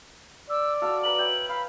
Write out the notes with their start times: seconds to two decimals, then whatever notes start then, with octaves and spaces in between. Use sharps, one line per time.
0.50 D5 E6
0.82 F#4 A4 F5 E6
1.03 A#4 B4 B5 F#7
1.18 C#5 E5 G5
1.49 F5 B5